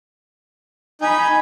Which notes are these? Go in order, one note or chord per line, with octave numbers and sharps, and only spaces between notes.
D#4 G#5 B5